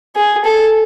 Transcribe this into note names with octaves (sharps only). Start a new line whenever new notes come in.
G#4
A4